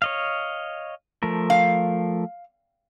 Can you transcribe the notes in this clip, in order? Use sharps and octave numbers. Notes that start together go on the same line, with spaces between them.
C#5 D#5 F5
F3 A3 A#4
F5